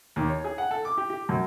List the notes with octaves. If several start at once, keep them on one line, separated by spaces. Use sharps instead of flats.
D#2
C#5
G#4
F#5
A4
D6
G4
G4
F#2